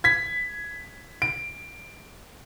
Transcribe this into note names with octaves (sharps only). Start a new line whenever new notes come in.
G#6 B6
D7